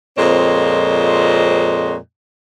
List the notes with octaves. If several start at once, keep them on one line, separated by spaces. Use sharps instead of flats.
F2 A#2 G#3 C4 C#5 D#5